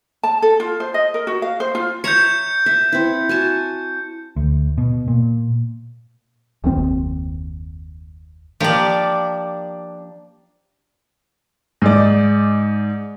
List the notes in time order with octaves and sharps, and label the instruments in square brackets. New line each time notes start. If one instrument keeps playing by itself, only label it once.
[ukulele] A5
A4
F4
C5
D#5
A#4
F#4
F5
C5
F4
[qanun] C#5 E5 A#5 [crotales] G6 C#7
[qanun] E5
C4 E4
F#4 G#5 A5
[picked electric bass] D2
B2
A#2
[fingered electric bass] F#1 D#2 C4
[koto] F3 A#3 G4 [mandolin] D4 D5
[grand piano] G#2 D5